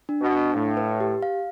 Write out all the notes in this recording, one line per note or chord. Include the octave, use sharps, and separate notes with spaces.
D4
B2
D4
A2 F5
B4
G4
F5